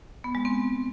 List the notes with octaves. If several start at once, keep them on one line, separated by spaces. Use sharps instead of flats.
B3
G#3
C4